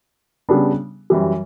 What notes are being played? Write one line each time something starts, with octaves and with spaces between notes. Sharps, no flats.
C#3 G3 B3 D4
F#2 E3 G3